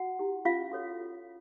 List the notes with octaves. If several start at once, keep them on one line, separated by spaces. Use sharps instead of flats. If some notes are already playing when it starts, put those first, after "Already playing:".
Already playing: F#4 F#5
E4 G4
C#4 F4 F5
F#4 A4 C#5